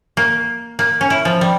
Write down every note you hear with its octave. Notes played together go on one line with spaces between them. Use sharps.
A#3
A#3
C#4
E4
F3
G3